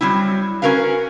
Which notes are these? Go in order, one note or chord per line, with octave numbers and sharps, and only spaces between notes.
F#3 G3 C4 E4
C#4 F#4 A#4 B4 F5